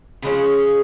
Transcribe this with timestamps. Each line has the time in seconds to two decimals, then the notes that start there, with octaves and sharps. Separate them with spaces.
0.22 C#3 F3 G#3 C#4